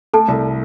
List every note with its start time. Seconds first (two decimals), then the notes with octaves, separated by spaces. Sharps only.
0.14 A3 A4 A5
0.28 C2